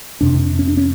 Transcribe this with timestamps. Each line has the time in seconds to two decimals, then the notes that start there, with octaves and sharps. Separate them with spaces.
0.21 F2 C3 D4
0.59 C#4
0.67 D4
0.77 C#4